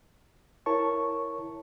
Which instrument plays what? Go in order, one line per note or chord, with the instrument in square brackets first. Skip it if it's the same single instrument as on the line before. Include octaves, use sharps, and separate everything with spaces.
[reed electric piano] E4 A#4 C#5 A5 C#6